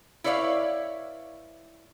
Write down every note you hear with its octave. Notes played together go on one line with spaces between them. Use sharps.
E4 B4 C#5 D5 E5 F5